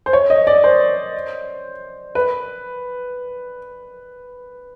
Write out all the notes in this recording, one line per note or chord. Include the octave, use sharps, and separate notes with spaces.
C5
C#5
D#5
D5
C5
B4